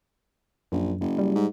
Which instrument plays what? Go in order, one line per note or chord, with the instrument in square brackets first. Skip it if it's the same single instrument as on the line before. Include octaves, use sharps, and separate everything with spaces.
[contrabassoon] A#1 [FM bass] F#2
[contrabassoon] F#1
[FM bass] G3
[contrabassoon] G#2